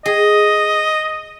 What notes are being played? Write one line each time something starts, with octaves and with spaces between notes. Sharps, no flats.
G#4 D#5